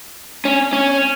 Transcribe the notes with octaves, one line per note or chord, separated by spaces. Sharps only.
C#4
C#4